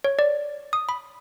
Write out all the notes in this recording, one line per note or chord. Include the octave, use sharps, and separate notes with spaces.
C#5
D5
D#6
B5